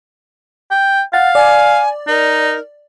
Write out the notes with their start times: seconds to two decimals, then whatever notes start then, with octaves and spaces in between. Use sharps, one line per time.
0.71 G5
1.13 F5 F#5 A6
1.35 D5 G#5
2.08 D#4 A#4